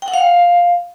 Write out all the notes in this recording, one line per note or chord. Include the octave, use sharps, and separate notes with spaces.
G5
F#5
F5